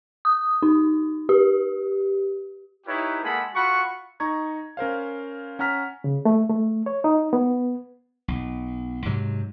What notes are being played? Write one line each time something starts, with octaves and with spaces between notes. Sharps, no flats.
D#6
D#4
G4
D#4 E4 G4 B4 C#5 A#5
G#3 A#3 G#4 A4 F#5 B5
F4 F#4 A4 F#5 B5 C#6
D#4 A#5 C#6 G#6
C#4 A#4 C5 F5
C#4 F#5 A#5 F6 B6
C#3
A3
A3
C#5
D#4
B3
B1
G#2 C3 F#3